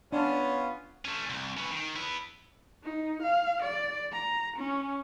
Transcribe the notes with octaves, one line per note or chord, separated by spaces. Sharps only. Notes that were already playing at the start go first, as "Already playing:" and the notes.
B3 C#4 D4 F4
A3 C#4
C2
C#4 B4
D#3
B3 E4
D#4
F5
D5
A#5
C#4